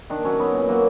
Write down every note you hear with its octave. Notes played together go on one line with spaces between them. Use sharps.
D#3 D4
F#3 C#4
F#3 B3
A#2
F#3 A#3